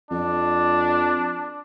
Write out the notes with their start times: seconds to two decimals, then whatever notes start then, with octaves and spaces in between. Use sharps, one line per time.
0.11 F2 D4